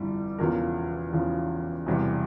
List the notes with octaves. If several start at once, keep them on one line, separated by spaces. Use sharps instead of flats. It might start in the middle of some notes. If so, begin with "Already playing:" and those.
Already playing: G1 F2 E3 G3
E1 E2 C#3 F3 A#4
E1 E2 C#3 F3
E1 E2 C3 G3